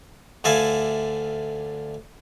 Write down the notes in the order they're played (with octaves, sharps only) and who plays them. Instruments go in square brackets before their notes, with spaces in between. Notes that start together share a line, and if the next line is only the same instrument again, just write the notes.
[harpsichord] D2 D3 D5 E5 F5 G#5